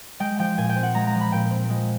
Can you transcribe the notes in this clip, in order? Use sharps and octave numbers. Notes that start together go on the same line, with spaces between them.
G#3 G5
F3 G5
A#2 G#5
G5
C4
F#5
G#3 A#5
A#5
F3
B5
A#2 G5
C4
G#3